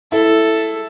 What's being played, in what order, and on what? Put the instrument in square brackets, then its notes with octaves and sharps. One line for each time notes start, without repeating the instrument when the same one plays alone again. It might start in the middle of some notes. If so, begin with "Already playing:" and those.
[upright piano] E4 [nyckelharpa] A4